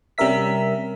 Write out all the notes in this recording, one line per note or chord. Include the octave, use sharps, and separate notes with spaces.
C3 G3 C#4 A#4 E5 B6